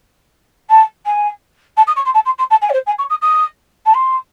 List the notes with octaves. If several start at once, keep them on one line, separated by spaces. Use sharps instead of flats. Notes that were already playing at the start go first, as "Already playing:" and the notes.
A5
G#5
A5
D#6
C#6
C6
A5
C6
C6
A5
G#5
C#5
C5
G#5
C#6
D#6
D#6
A5
C6